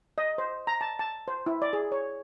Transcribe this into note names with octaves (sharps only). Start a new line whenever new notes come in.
D#5
C5
A#5
A5
A5
C5
E4
D5
G#4
C#5